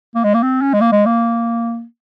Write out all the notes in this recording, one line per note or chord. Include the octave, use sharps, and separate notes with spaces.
A#3
G#3
A#3
C4
C#4
G#3
A#3
G#3
A#3